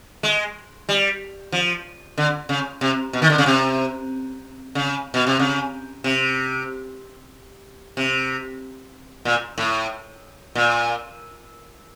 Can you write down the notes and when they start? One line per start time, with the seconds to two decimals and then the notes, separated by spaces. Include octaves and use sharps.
0.23 G#3
0.89 G3
1.52 F3
2.18 D3
2.49 C#3
2.81 C3
3.13 B2
3.22 D#3
3.30 D3
3.38 C#3
3.46 C3
4.75 C#3
5.14 B2
5.27 C3
5.39 C#3
6.04 C3
7.97 C3
9.25 A#2
9.58 A2
10.55 A#2